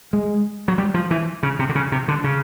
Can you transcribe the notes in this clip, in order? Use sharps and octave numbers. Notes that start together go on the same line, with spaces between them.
G#3
F#3
G3
F3
E3
C#3
C3
D3
C#3
C3
D3
C#3